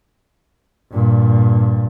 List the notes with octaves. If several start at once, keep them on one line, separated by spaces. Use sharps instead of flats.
G2 A#2